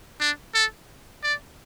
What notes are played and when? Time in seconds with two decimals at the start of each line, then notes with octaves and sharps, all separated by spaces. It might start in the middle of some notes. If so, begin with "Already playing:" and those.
0.20 D4
0.54 A4
1.23 D5